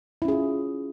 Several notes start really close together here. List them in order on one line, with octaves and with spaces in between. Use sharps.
E4 C#4 G#4 F4